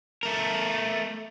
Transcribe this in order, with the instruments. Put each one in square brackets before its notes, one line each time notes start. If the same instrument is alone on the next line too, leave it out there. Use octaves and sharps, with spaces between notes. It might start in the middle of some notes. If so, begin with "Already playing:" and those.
[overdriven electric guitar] A3 A#4